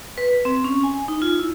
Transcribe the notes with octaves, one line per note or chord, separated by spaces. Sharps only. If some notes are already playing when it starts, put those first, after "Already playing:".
B4
C4
C#4
G#5
D#4
F4
E4